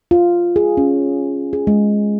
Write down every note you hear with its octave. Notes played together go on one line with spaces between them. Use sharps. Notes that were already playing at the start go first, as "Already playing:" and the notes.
F4
G#4
C#4
G#4
G#3